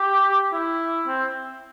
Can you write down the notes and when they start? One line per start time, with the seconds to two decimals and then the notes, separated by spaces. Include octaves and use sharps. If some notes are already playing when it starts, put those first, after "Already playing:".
Already playing: G4
0.53 E4
1.07 C4